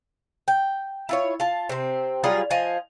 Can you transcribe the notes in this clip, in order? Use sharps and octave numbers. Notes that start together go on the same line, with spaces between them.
G5
E4 F4 C#5
F4 A5
C3 C4
F#3 G3 F4 G#4
F3 F4 D#5 G#5